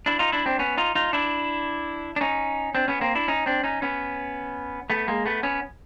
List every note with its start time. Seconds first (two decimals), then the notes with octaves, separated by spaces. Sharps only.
0.06 D4 E4
0.19 D#4 F4
0.32 D4 E4
0.46 C4 D4
0.59 B3 C#4
0.77 D#4 F4
0.95 D#4 F4
1.13 D4 E4
2.16 D4
2.21 C#4 D#4
2.75 C4 D4
2.88 B3 C#4
3.01 A#3 C4
3.15 D4 E4
3.28 C#4 D#4
3.46 C4 D4
3.63 C#4 D#4
3.82 B3 C#4
4.90 A3 B3
5.08 G#3 A#3
5.26 A3 B3
5.43 B3 C#4